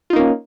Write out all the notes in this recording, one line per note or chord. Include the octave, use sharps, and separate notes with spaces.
A#3 C#4 D#4 F4